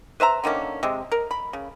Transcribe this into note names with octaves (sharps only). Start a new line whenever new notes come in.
B4 C5 E5 A#5
D3 D#3 A#3 C#4
C3 G#3
A#4
B5
C#3